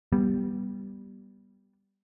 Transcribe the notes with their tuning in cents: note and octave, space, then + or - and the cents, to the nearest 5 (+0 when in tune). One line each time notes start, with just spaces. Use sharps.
G3 +0 B3 -15